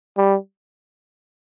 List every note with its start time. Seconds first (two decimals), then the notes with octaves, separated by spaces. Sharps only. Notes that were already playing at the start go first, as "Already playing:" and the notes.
0.18 G3